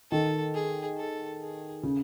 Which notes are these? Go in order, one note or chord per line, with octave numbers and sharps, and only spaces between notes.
D#3 A4
G#4
A4
G#4
C#3